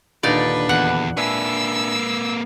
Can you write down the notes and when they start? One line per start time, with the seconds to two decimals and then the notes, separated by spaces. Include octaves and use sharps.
0.23 D#2 A#2 D3 D4 D#4 B4 D5
0.69 E2 F#5
1.17 A#3 D4 B4 E5 G#5 E6